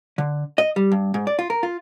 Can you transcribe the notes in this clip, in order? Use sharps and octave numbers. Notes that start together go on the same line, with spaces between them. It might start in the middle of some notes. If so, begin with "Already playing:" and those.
D3
D#5
G3
G2
G#2
D5
F4
A#4
F4